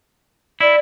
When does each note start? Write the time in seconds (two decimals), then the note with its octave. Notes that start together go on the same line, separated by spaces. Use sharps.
0.61 E4 D5